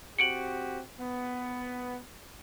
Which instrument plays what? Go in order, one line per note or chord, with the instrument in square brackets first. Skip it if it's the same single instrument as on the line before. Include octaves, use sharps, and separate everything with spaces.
[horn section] C4 F#4 G4 [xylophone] C#7 D7 F#7
[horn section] B3